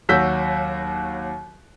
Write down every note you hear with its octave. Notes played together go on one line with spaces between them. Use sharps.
D#2 F#3 F#4 E6 G6 B6